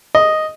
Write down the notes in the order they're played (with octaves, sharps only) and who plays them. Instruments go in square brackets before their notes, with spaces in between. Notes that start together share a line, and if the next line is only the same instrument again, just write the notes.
[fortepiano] D#5